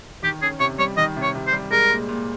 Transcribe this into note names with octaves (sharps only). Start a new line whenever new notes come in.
D#3 G4
C#4 G#4
C3 C#5
G3 C#5
D#3 D#5
C3
C#5
C3
C5
G3
G#3 A#4
A#2
A#2